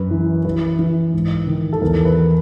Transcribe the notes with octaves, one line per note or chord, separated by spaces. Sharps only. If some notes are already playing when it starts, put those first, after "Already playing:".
Already playing: F#2 B4
E3
E3 B4
E3
G#2
D#3
A4
E2 A#4
B4